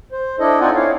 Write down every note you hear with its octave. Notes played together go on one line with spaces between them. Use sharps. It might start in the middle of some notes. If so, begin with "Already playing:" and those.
C5
D4 E4 A4 D#5
C4 D#4 F4 D5 F#5 G#5
E4 C#5 F5